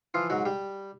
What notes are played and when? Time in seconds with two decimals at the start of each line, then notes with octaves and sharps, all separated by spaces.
0.14 E3 F3 F4
0.30 G#2 F#3 F#4
0.45 G3 G4